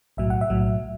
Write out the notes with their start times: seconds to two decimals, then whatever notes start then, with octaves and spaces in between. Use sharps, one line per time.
0.17 B1 A2 F#3 E5
0.30 F#5
0.41 E5
0.50 B1 A2 F#3